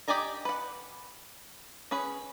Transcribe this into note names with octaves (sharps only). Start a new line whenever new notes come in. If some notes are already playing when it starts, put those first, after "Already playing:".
G4 D5 D#5 G#5 A#5
B4 F#5
C#4 G#4 B4